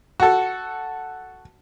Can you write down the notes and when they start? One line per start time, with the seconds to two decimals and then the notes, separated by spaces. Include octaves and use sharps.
0.20 F#4 A4